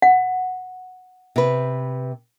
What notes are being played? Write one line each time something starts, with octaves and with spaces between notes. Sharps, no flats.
F#5
C3 B4